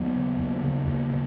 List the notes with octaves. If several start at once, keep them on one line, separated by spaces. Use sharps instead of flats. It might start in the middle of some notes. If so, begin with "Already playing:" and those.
Already playing: D#2 F#3 B3
C#3
D#2
C#3
D#2
C#3